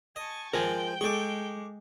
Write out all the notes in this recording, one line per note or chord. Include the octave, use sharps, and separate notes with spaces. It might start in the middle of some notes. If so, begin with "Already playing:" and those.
D#5 G#5 A5 C#6
F3 G#3 A#4 C5 G5 G#5
G#3 G#4 A4 C#6 D6